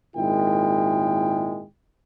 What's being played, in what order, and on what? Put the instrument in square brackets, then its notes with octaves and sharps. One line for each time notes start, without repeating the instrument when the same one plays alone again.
[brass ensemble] G#1 A#2 G#3 E4 G5